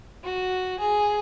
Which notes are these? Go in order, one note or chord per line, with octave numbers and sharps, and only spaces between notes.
F#4
G#4